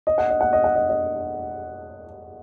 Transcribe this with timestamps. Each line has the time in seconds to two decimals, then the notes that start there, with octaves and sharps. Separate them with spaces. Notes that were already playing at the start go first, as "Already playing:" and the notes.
0.07 D#5
0.18 F#5
0.30 D#5
0.41 F#5
0.53 D#5
0.64 F#5
0.75 D#5
0.89 D#5